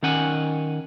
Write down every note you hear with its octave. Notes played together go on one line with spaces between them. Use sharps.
D#3 C#4 F#5 G#5